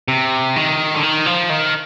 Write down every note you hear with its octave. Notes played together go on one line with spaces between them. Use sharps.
C3
D#3
D3
D#3
F3
D#3